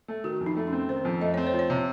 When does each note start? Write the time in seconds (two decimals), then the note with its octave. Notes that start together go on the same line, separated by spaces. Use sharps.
0.08 A3
0.24 D#3 F#4
0.41 F2
0.46 D#4
0.57 A3
0.67 C#4
0.72 C4
0.89 D#3 C5
1.05 F2
1.21 A3 D#5
1.34 C4 C#5
1.47 C5
1.53 F3
1.59 C#5
1.70 C3